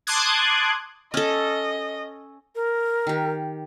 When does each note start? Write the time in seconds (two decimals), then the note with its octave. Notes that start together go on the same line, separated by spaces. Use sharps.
0.07 A5 C6 D6 D#6 F#6 G#6
1.14 C#4 A4 D#5
2.55 A#4
3.07 D#3 G4